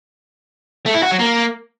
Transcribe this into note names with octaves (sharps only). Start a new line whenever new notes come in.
A3
E4
F#4
F#3
A#3